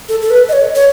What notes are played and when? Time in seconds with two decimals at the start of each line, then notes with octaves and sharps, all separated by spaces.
0.09 A4
0.22 A4
0.30 B4
0.49 D#5
0.53 C#5
0.75 C#5